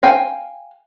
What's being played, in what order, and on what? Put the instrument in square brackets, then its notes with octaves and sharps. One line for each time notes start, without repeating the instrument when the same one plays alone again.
[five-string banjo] F5 G5 G#5